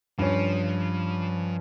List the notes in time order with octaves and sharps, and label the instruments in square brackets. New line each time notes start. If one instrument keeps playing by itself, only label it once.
[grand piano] G2 C#4 [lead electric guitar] F3